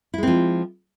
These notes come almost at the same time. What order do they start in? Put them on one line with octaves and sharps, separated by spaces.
E4 G#3 C4 F3